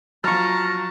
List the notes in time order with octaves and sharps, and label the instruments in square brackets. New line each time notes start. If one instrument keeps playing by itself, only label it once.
[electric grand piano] F3 F#3 [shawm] A5 [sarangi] A#5 [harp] C#6 F6